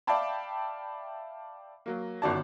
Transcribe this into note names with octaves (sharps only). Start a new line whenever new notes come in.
D5 E5 F5 G5 A5 B5
F#3 A#3
G1 F#2 D#3 F#4 D5 A5